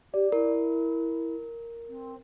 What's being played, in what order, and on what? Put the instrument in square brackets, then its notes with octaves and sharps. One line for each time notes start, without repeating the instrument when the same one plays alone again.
[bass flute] G4 [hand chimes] D5
[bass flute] E4 [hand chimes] A#4
[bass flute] C4